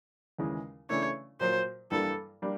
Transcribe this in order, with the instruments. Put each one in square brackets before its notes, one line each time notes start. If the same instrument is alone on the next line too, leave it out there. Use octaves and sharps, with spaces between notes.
[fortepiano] D#2 C#3 E3 G#3
[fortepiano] C#3 E3 A3 D4 [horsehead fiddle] C#5
[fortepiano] A#2 F#3 A#3 [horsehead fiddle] C5
[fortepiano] G2 E3 G3 A#3 [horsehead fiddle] A4
[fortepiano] G3 A#3 D4